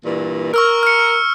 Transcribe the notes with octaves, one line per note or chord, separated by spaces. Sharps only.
G2 A#2 E3
A#4 C#6 E6 F6
F6 C#7